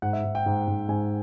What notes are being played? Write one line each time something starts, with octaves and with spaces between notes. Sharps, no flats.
G#2 F#5
E5
G#2
G5
G#2
G#2
G#2 G#5